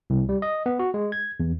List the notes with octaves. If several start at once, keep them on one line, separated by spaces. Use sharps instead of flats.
C2
G3
D#5
B3
F#4
G#3
G#6
E2